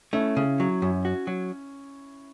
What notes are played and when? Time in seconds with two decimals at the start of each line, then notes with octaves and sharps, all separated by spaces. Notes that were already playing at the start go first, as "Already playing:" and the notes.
0.13 A3 C#4 E4
0.37 C#3
0.60 F#3
0.82 F#2
1.05 F#4
1.27 F#3